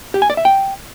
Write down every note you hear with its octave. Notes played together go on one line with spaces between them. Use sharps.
G4
G#5
D5
E5
G5